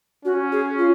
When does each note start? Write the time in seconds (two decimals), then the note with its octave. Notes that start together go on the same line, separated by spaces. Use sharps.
0.25 C#4 F#4
0.52 G#4
0.78 F4